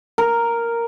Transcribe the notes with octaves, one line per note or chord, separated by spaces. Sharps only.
A#4